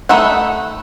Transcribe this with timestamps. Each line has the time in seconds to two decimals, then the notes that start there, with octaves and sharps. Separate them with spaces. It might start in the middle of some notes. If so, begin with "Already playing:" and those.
0.09 A3 D#4 B4 E5 F#5